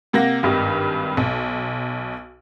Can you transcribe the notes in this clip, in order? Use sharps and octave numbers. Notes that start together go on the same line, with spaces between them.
C3 A#3 F#5 A#6
G#1 G2 D#3 G4
B1